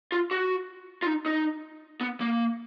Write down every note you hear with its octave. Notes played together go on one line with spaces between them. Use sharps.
F4
F#4
F4
D#4
D#4
B3
A#3